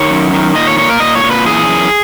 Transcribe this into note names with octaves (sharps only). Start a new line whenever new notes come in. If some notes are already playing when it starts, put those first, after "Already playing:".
Already playing: D#3 C#5
F#2
D#3
A#2 D#5
C#5
A#2 C#5
A#4
A#2 D#5
C#5
A#2
B4
E3 G#4
F#2